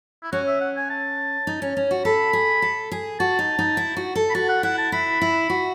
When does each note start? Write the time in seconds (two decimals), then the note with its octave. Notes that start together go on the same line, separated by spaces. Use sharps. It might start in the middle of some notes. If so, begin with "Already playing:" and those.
0.23 E4
0.32 C#4 F#4
0.47 E5
0.61 F#5
0.76 G#5
0.90 A5
1.47 D#4
1.62 C#4
1.77 C#4
1.91 F#4
2.05 A4 B5
2.33 G#4
2.62 A4
2.92 G#4
3.20 F#4 A5
3.39 D#4
3.59 D#4
3.77 E4
3.97 F#4
4.16 A4
4.30 B5
4.35 F#4 A5
4.49 F#5
4.63 E4 F#5
4.78 A5
4.92 E4 B5
5.21 E4
5.50 F#4